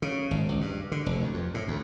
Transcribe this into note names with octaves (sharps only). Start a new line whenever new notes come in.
C#3
G#1
C#2
G2
D3
F1
D2
F2
A2
D2